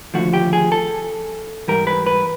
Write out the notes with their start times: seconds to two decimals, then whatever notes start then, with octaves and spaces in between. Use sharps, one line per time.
0.14 D#2 D3 F3 A3 F#4
0.34 G4
0.53 G#4
0.72 A4
1.68 G#2 E3 G3 A#4
1.87 B4
2.07 B4